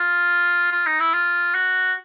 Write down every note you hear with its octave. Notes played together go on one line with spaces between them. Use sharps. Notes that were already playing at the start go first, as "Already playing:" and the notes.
Already playing: F4
F4
D#4
E4
F4
F#4